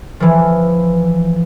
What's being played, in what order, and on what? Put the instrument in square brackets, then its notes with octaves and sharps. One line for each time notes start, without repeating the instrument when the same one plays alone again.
[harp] E3 F3